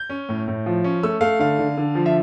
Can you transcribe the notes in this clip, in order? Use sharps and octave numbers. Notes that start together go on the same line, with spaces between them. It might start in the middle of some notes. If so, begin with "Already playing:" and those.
Already playing: G6
C#4
A2
A2
F3
C#4
A3 E6
A3 F5
D3 F5
D3
D3
F3
E5